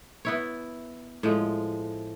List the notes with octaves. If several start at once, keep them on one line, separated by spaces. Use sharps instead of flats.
B3 E4 C#5
A2 F3 G#3